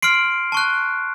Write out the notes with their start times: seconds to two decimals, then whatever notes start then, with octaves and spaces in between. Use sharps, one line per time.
0.02 C6 F6 C7 D7
0.52 A5 C#6 F#6